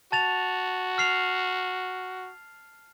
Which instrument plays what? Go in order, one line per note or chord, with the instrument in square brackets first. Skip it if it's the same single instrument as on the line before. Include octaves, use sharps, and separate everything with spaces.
[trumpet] F#4 [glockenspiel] A5 A6 F7
[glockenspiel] F6 C7 F7